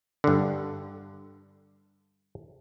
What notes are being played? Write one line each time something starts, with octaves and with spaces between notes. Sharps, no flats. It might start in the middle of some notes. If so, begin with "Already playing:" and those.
G2 D3